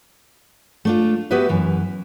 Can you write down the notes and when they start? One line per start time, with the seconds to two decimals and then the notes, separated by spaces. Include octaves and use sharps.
0.85 A3 D4 F4
1.30 B3 F#4 G4 B4 E5
1.49 F#2 E3